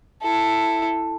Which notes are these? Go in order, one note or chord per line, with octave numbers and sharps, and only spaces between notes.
E4 A4